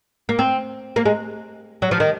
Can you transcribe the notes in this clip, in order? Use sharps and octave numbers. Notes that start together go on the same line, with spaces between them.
A#3
C4
A#3
G#3
F#3
F3
D#3